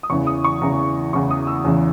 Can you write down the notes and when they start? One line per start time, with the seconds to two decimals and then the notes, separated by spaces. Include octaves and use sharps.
0.03 D#6
0.10 E2 C#3 E3 C#6
0.27 D#6
0.44 C#6
0.61 E2 C#3 E3 A#5
1.13 E2 C#3 E3 C#6
1.30 D#6
1.47 E6
1.64 E2 C#3 E3